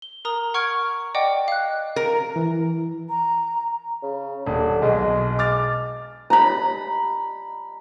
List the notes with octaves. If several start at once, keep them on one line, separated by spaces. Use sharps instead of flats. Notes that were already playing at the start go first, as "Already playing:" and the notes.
G7
A#4 A#5 D#6 G7
F#5 C#6 F6 G#6 D7
D5 D#5 F#5 G5 D6
F5 F#6
A#4
E3
A#5
C#3
D#1 D3
B1 B2 G#3
D6 F6 A6
A#5 B5